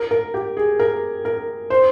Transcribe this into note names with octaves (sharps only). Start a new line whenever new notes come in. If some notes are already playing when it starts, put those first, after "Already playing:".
Already playing: A#4
A#4
G4
G#4
A#4
A#4
C5